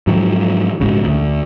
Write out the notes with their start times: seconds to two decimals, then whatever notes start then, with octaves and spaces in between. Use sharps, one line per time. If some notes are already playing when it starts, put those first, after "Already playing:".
0.07 G#2 D#3 F3 F#3
0.80 A#1 G#2 C#3
1.04 D2